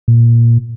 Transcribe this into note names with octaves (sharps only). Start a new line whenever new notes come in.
A#2